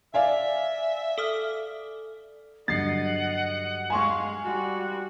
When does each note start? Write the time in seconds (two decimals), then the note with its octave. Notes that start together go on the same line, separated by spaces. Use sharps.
0.14 D5 E5 F5 G#5
1.18 A4 D#6 F6
2.68 G2 D3 F#3 D#5 F#5 A6 C7
3.90 G#3 F5 G#5 C6 C#6
4.44 G3 F#4